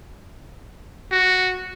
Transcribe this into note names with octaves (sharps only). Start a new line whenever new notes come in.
F#4